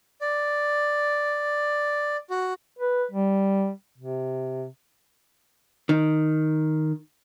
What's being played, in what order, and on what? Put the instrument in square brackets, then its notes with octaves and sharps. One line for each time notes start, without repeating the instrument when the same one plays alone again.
[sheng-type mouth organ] D5
F#4
[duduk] B4
G3
C3
[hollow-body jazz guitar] D#3